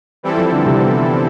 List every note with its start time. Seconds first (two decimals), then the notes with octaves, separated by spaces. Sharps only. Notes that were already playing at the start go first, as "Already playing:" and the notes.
0.23 E3 G3 C4 E4 A4
0.37 F3
0.52 D3
0.66 C3
0.80 B3